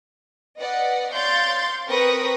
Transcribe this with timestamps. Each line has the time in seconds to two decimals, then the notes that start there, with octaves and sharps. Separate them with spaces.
0.60 B4 D5 D#5 F#5
1.13 C#5 D5 F5 C6 G6 A6
1.88 C4 A#4 B4 C#6 D#6 A#6